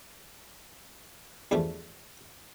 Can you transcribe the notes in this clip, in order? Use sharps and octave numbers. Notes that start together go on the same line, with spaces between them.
E2 G2 F3 A3